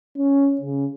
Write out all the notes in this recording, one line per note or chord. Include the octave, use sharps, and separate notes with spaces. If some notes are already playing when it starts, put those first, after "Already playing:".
C#4
C#3